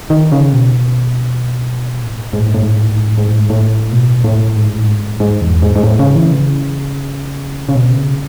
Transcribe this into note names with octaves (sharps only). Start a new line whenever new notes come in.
D#3
C#3
B2
A2
G#2
A2
G#2
A2
G#2
A2
G#2
A2
G#2
A2
G#2
A2
G#2
A2
G#2
A2
B2
A2
G#2
A2
G#2
G#2
E2
G#2
G#2
A2
C#3
E3
C#3
C#3
B2
C#3